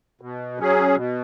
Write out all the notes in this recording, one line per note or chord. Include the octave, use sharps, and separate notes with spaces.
B2
F#3 C#4 G#4
B2